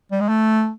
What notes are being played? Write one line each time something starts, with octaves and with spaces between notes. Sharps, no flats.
G3
G#3
A3